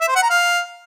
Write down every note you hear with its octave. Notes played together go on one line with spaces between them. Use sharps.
E5
C5
F#5
A#5
F5